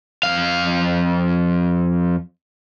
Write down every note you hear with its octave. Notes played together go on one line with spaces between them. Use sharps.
F2 F5